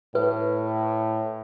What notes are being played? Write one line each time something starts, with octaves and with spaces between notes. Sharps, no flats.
A2 B4